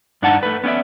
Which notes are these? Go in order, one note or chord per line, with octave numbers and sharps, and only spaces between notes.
G2 D4 D#4 F#5 A5
A3 B4
B3 C#4 E4 D5 E5